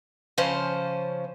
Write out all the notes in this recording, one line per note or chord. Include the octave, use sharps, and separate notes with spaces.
C#3 F3 C#4 C5 A5